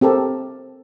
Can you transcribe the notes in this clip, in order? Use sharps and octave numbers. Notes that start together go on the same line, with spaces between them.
C4 G4 A4 A#4